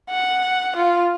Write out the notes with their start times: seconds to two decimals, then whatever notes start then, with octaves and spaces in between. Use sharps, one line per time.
0.11 F#5
0.76 F4